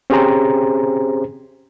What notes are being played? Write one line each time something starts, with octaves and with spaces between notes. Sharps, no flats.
C4 C#4 G4 G#4 C5 A#5